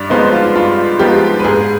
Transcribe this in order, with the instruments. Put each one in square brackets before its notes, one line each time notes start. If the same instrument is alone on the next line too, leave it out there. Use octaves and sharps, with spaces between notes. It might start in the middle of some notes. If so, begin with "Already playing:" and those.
Already playing: [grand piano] G2 [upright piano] D5
[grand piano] F3 G#3 B3 D#4 [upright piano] C5
[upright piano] F4
[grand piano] G2 [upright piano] F4
[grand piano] F3 G#3 B3 D#4 [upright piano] G4
[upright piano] B4
[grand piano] G#2 [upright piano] G#4